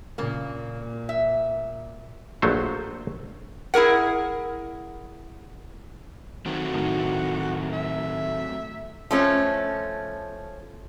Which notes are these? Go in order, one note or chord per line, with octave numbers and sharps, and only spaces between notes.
A#2 C#3 A#3
E5
A#1 F#3 A3 C5
E4 G#4 A#4 F#5
D#3 F#3 A3 C4 F#4
A2 D#3
E5
F3 A3 C#4